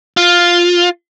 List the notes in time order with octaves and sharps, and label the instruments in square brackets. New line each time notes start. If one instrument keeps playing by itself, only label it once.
[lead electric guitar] F4